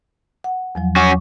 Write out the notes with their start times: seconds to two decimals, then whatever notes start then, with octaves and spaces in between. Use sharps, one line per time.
0.44 F#5
0.75 E2 F3 F#3
0.96 C#4 F#4 C#6 D6